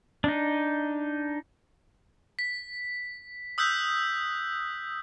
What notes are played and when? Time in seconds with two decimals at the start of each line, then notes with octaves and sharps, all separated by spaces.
0.24 D4 D#4
2.39 B6
3.58 D#6 E6 F#6 G6 B6